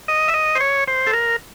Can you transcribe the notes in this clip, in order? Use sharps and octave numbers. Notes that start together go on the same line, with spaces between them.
D#5
E5
D#5
C5
C#5
C5
A4
A#4